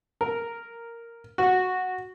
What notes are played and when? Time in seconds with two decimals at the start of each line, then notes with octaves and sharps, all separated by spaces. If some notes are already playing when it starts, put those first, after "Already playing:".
0.21 A#4
1.38 F#4